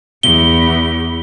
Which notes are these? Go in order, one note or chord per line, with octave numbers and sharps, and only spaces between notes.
E2 G7